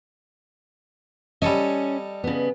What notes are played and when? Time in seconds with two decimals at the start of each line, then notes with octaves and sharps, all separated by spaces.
1.42 G3 C#4 A4 D#5
2.24 C#3 B3